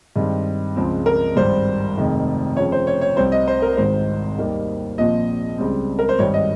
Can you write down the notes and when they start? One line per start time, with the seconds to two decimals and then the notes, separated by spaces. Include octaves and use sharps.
0.16 G2 D#3 G#3 C4
0.76 C#2 C#3 F3 G#3 C4
1.06 A#4
1.36 G#1 G2 G3 C5
1.97 F1 F2 D#3 G#3
2.56 F2 C#3 F3 C#5
2.72 C5
2.87 C#5
3.01 C#5
3.17 C2 C3 G3 C4 C5
3.32 D#5
3.48 C5
3.62 A#4
3.77 G#1 G#2 D#3 C5
4.38 D#2 D#3 G3 A#3
4.98 A#1 A#2 F3 C4 D#5
5.58 C#2 C#3 G3 C4
5.99 A#4
6.09 C5
6.19 G#1 G2 D#3 G3 C#5
6.34 D#5